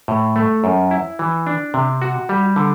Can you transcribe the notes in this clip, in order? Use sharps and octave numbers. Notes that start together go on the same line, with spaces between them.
A2
A3
F#2
E4
E3
D4
C3
F#4
G3
D3